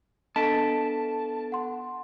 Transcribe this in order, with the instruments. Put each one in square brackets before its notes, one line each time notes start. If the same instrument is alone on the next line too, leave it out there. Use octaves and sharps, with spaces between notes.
[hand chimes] B3 A4 D7 [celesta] D4 D#5 B6 [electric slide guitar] A5
[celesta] F#5 C6